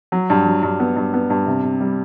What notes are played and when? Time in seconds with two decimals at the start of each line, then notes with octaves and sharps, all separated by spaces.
0.12 F#3
0.30 G2
0.46 F#3
0.63 G2
0.80 B3
0.96 G2
1.14 B3
1.30 G2
1.46 C3
1.64 C3
1.81 G3